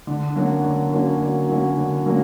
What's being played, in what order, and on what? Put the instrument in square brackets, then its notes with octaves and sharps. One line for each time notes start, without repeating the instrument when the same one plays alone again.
[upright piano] D3
F#3 A#3 C#4 F#4
D3
F#3 A#3 C#4 F#4
D3
F#3 A#3 C#4 F#4
D3
F#3 A#3 C#4 F#4